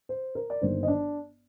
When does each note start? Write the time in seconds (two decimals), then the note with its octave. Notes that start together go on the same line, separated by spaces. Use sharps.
0.09 C5
0.35 A#4
0.50 D5
0.61 G1 G2 D#3 A#3 D#4 C5
0.83 D#5
0.88 D4 D5